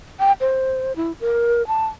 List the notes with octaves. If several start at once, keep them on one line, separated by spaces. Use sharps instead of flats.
G5
C5
E4
A#4
A5